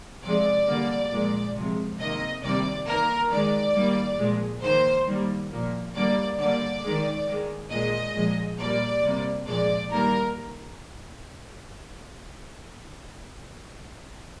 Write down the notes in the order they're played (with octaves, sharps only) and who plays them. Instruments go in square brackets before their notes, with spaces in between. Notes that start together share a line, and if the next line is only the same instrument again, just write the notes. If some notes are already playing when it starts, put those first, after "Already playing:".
[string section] C3 F3 G#3 D5
D3 G3 A#3
A#2 F3 G#3
C3 F3 G#3
C3 D#3 A#3 D#5
C3 D#3 G3 A#3 D5
D#3 A#3 A#4
D#3 G#3 D5
D#3 G3 A#3
A#2 F3 G#3
D#3 A#3 C5
D#3 G3 A#3
A#2 F3 A#3
D3 G3 A#3 D5
D3 G3 A#3 D5
D#3 G#3
D#3 G#3
A#2 G#3 D#5
A#2 F3 G#3
A#2 G3 A#3 D5
C3 G3 A#3
A#2 F3 G#3 D5
D#3 G3 A#3 A#4